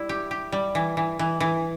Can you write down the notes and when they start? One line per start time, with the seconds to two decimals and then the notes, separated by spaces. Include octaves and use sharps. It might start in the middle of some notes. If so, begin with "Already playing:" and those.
Already playing: G3 E4
0.09 G4
0.31 G4
0.52 G3
0.75 E3
0.97 E3
1.19 E3
1.40 E3